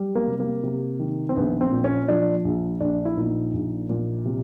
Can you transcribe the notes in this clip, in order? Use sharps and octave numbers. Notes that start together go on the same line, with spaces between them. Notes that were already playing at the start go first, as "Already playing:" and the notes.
Already playing: G3
A#3
C3
A#3
C3
D#3
C4
A#1 B3
C4
A#2
C#4
F3 D4
A#1
A#1 D4
E4
A#2 D#4
A#1
A#2
C3